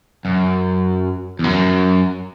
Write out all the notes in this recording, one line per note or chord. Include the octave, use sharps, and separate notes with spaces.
F#2
E2
F#2